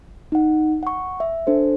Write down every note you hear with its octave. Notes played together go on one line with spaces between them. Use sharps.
D#4 F#5
F#5 C#6
E5
D4 A4 C5